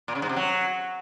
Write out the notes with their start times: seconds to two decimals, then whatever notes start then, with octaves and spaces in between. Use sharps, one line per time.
0.08 A#2
0.15 C#3
0.22 G#2
0.29 C3
0.36 F#3